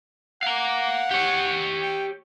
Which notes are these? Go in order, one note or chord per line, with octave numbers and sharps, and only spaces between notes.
F5 F#5 A#5
G4 C#5
G5